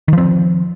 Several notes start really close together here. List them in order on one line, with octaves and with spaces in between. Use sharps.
D#3 F3 C4